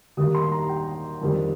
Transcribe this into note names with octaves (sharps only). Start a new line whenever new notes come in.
D#2 D#3 G3 D#6
C6
A#5
G5
F2 D#3 G3